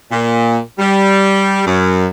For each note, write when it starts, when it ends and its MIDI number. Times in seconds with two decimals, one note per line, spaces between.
0.12 0.58 46
0.79 1.62 55
1.67 2.08 42